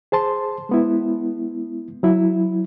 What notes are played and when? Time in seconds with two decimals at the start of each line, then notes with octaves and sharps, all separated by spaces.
0.12 G#4 C5 A5 C6
0.69 G#3 B3 E4
2.03 F#3 E4